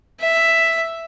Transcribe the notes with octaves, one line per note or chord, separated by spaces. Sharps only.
E5